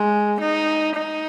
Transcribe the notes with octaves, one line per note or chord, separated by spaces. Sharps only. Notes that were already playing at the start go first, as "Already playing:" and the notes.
Already playing: G#3
D#4
D#4